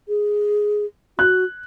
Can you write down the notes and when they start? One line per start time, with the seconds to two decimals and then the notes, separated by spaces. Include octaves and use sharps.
0.08 G#4
1.19 F#4 F#6